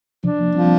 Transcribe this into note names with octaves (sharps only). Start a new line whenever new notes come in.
C3 F3 D4
F3 A#3
F3 G3 C4